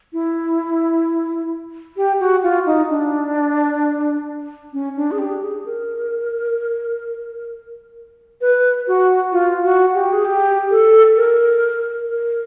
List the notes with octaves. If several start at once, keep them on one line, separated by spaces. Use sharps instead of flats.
E4
G4
F#4
F4
D#4
D4
C#4
D4
G#4
G4
G#4
A#4
B4
F#4
F4
F#4
G4
G#4
G4
A4
A#4
A#4